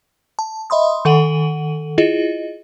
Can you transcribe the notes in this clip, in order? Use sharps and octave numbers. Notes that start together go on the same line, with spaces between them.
A5
D#5 E5 B5 C6 D#6
D#3 A4 F#5 D#7 F#7
E4 F4 G#4 D#5